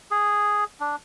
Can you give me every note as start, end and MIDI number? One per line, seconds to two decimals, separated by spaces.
0.11 0.64 68
0.81 0.96 62